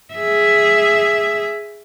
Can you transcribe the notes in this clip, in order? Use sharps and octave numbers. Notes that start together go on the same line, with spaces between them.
G#4 E5